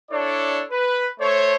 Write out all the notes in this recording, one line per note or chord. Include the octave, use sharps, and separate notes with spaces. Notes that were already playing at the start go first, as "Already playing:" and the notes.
D4 E4 A4 C#5 D5
B4
A3 A4 C5 C#5